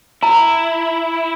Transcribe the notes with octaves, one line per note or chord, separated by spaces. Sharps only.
E4 A#5